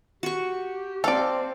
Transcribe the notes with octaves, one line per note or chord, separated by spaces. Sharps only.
F#4 G4 C#6
C4 A4 D5 F5